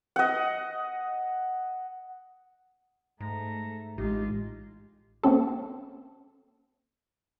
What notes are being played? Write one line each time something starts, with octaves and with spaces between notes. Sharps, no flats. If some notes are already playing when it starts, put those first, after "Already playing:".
D#5 F#5
G#2 A3 A#5
A1 G#3 D#4 F4 G4
A#3 C4 C#4 A4